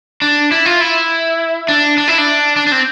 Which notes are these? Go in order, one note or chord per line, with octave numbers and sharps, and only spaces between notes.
D4
E4
F4
E4
D4
D4
E4
D4
D4
D4
C4